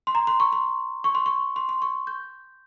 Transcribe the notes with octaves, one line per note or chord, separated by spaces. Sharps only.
C6
A#5
C6
C#6
C6
C#6
C6
C#6
C6
C6
C#6
G6